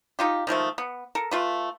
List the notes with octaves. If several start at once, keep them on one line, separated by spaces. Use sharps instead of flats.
D#4 F4 G4
D#3 F3 G#3 A3
B3
A4 A#4
A3 F4 B4